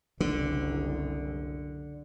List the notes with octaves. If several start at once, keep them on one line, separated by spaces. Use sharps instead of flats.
F#1 C2 D3